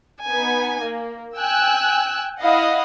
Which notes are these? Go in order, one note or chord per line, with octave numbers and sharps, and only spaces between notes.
B3 D#4 G#5
A#3
G5 G#5 E6 F#6
E4 D#5 F5 F#5